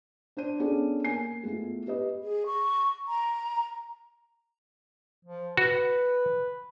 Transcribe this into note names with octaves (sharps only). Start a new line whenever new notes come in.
D4 C5 D#7
B3 C#4 D4 G#4 A4
A#3 G#5 C7
G#3 A3 B3 E4 F4
G4 B4 D#5
G#4
C#6
A#5
F3
F#4 B4